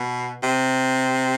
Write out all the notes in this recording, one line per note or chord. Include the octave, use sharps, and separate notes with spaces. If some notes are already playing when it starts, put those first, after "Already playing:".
Already playing: B2
C3